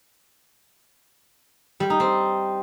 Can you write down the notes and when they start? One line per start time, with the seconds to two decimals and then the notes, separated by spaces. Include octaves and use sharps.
1.80 G3
1.90 D#4
2.00 C4